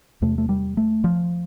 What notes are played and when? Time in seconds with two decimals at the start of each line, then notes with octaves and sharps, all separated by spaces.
0.22 E2 C3 A3
0.38 A3
0.49 G3
0.77 A3
1.04 F3